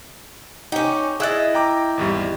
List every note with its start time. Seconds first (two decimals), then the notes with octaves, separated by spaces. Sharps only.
0.72 C#4 D#4 G4
1.20 E4 G#4 D#5 F#6 A6
1.55 G5 A#5 D6
1.98 G#1 E2 G3